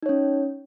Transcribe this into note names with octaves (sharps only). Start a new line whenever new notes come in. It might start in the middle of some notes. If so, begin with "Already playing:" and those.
C#4 D#4 C#5